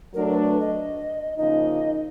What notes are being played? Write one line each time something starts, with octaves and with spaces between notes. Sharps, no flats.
F#3 A3 D4 A#4
B4
B4
D#5
C#3 F3 A#3 D#4 D#5